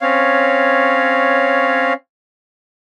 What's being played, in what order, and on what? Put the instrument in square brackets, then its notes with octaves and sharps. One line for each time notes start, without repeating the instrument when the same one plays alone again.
[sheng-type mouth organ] C4 C#4 C#5 F5